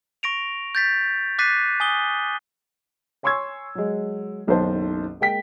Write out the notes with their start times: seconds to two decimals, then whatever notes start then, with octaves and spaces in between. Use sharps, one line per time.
0.23 C#6 A#6 D7 F7
0.75 G6 A6 B6
1.39 D6 F#6 A6 B6 C7 D#7
1.80 G#5 D#6 G7
3.23 C#5 G#5 C6 C#6 E6 G#6
3.75 F#3 G#3
4.47 F#1 B1 D#3 C#4 C5 A5
5.21 G#3 A#3 G5 B6